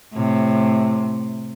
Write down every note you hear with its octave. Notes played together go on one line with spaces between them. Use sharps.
A2 C3